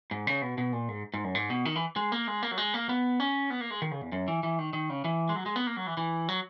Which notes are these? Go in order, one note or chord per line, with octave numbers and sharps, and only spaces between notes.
G#2
C#3
B2
B2
A#2
G#2
G#2
F#2
G#2
B2
D#3
E3
G#3
A#3
G#3
A#3
F#3
G#3
A#3
B3
C#4
B3
A#3
G#3
D#3
C#3
E2
F#2
E3
E3
D#3
D#3
C#3
E3
G#3
F#3
G#3
B3
A#3
F#3
E3
E3
F#3